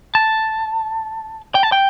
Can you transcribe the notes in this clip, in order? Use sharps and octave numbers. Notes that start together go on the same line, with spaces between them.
A5
G5
A5
G5